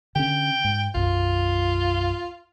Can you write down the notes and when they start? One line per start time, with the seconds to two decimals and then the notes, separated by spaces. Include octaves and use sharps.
0.15 D3 C#4 G5
0.64 G#2
0.95 B1 F#2 F4